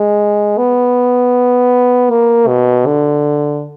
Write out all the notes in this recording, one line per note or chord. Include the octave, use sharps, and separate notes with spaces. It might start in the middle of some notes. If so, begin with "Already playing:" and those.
Already playing: G#3
B3
A#3
B2
D3